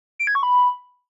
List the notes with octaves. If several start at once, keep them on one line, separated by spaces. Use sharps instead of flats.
D7
G#6
C#6
B5